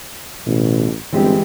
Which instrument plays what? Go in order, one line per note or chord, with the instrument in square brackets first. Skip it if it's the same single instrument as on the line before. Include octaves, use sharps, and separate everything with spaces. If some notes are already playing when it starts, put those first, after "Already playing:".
[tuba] A1 [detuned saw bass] B2
[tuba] G1 [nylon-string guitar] E3 G#3 G4 [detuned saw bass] C4